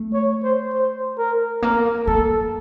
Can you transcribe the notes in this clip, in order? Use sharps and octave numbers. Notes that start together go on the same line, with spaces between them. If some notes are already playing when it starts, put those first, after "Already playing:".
Already playing: A3
C#5
C5
C5
A#4
A#3 A#4
A#3 A4